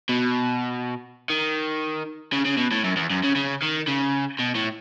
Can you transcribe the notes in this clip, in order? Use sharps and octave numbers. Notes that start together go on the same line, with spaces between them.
B2
D#3
C#3
C#3
B2
A2
F#2
E2
F#2
C#3
C#3
D#3
C#3
B2
A2